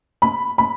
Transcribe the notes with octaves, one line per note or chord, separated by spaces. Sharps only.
B5
B5